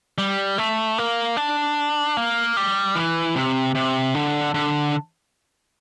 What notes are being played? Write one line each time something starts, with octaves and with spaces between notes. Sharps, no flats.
G3
A3
A#3
D4
A#3
G3
E3
C3
C3
D3
D3